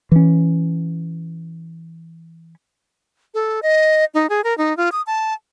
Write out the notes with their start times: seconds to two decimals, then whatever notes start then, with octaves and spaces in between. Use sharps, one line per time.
0.12 E3 C#4
3.34 A4
3.63 D#5
4.14 D#4
4.30 G#4
4.44 A#4
4.58 D#4
4.77 F4
4.92 D#6
5.07 A5